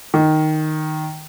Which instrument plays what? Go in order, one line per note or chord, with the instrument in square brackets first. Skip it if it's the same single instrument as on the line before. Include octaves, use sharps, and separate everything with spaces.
[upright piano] D#3